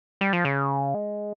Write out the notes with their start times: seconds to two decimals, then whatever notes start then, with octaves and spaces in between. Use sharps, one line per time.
0.21 G3
0.33 F3
0.45 C#3
0.94 G#3